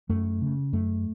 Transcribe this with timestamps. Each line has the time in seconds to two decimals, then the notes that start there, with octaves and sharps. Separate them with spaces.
0.09 F#2 A3
0.42 C#3
0.73 F#2 A3